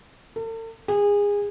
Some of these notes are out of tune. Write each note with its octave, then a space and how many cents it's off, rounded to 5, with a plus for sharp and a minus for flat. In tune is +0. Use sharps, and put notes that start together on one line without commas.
A4 +45
G#4 -25